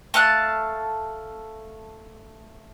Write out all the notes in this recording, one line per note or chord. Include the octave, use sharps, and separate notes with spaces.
A3 F5 A5 F#6